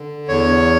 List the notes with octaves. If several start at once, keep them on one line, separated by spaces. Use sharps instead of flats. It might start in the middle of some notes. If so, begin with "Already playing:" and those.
Already playing: D3
E2 C#5